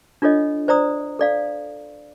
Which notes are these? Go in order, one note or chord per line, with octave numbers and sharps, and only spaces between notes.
D4 F4 A4 C#5 D#5
C5 D5 A#5 D#6
A4 D5 F5